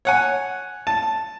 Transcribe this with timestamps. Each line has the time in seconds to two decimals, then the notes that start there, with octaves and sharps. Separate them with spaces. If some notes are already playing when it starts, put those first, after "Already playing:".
0.05 C#5 F#5 G#5
0.87 A5